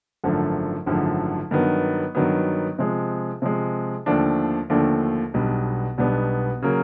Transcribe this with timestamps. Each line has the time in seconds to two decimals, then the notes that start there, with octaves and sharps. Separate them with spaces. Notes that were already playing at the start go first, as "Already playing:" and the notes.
0.24 G#1 F#2 D3 F3 A3
0.86 G#1 F#2 D3 F3 A3
1.51 G2 D#3 F#3 B3
2.15 G2 D#3 F#3 B3
2.79 C3 F3 G#3
3.42 C3 F3 G#3
4.06 D#2 D3 F3 A3 D4
4.70 D#2 D3 F3 A3 D4
5.34 B1 B2 G3 B3 D4
5.98 B1 B2 G3 B3 D4
6.62 C#3 F#3 A#3